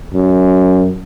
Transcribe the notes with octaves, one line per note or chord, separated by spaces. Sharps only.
F#2